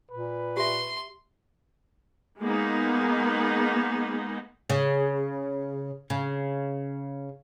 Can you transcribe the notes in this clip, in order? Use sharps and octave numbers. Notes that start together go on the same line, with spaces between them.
A#2 B4
G4 E5 C6
G#3 A#3 B3 D#4
C#3
C#3